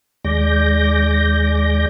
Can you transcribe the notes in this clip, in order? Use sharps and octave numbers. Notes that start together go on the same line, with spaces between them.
D#2 G#3 D5 G6 A#6